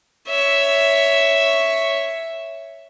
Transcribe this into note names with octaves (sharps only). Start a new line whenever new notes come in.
C#5 E5